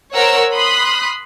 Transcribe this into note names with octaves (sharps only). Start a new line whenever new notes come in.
A#4 C5 C#5 F#5 E6
B5 C6 D#6 F#6 B6